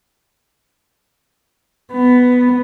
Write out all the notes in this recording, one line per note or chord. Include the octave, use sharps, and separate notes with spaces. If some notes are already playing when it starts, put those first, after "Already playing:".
B3